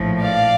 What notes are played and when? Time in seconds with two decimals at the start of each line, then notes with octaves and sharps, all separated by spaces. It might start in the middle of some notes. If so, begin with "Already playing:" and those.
Already playing: A#1 A2 F3
0.23 D5 F5